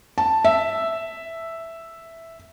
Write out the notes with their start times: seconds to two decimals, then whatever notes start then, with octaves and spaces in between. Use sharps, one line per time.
0.18 A5
0.45 E5